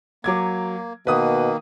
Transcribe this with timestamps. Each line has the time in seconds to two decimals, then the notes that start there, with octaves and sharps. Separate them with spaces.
0.24 F#3 A#3 D6 G#6
1.07 B2 D#3 A#3 B4 D#6